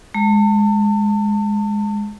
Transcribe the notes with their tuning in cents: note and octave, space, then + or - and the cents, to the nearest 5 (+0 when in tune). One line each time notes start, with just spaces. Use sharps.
G#3 +0 A5 +35